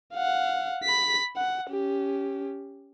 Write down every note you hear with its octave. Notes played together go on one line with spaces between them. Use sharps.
F5 F#5
B5 B6
F#5
C#4 G4